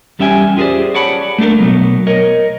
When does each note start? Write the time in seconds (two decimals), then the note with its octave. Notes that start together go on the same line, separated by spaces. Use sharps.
0.19 E2 G3 C#4 E5 G5 G#5
0.57 F4 G4 G#4 A#4 C5 D5
0.95 C#5 D5 F#5 A5 B5
1.38 A3 A#3 D4 A4 A#4
1.59 B1 E2 F#3 B3
2.07 A#4 C#5 D#5